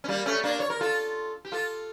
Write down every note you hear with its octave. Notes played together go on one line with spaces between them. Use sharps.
C#4
G3 A#3
A3 C#4
A#3 D4
C#5
A#4
F4 A4
G4
F4 A4